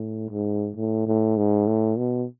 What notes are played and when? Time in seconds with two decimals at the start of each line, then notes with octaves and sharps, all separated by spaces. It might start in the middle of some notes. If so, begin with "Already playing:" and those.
Already playing: A2
0.30 G#2
0.76 A2
1.07 A2
1.37 G#2
1.67 A2
1.98 B2